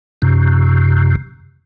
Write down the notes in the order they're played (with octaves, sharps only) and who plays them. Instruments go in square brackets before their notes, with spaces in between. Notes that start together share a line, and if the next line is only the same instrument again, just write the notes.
[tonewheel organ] F#2 C3